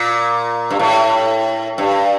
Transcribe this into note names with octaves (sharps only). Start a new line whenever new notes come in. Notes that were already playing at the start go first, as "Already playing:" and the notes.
Already playing: A#2
G2
A2
G2